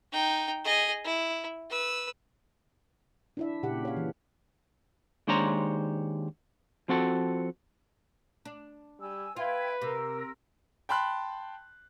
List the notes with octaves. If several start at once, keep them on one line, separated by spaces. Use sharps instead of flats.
D#4 G5
G#4 D#5
E4
B4 E6
D4 E4 E5
A#2 C#3 G4 F#5
C#5 F5
E3
D#2 G#3 D4 C5 C#5 A#5
F3 C4 F#4 A4
D4
G3 G#5 E6
F4 B4 E5 G5 G#6
C3 A#4 E6
G5 A5 B5 C6 F#6